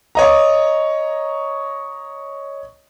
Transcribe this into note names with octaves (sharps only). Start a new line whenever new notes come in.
C#5 D#5 A#5